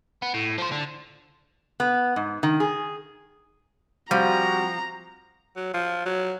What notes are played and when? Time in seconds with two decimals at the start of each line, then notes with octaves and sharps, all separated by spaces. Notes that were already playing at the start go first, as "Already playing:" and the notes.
0.22 B3
0.34 A2
0.58 F3 C5
0.72 D3
1.80 B3
2.16 G#2
2.43 D#3
2.60 G#4
4.11 F3 G3 C4 F#4 A#5
5.56 F#3
5.74 F3
6.06 F#3